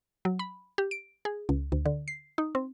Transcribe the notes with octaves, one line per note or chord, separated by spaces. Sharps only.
F#3
B5
G4
D7
G#4
C#2
D2
D3
C7
D#4
C4